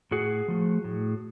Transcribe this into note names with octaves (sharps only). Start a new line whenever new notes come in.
A2 F#4 G#4
F3 A3
A2